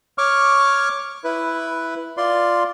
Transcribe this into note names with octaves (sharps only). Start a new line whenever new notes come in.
C#5 C#6 D6 F6
E4 B4
F4 D5 C6